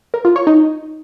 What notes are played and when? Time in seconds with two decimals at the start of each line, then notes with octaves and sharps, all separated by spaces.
0.14 A#4
0.25 F4
0.36 C#5
0.47 D#4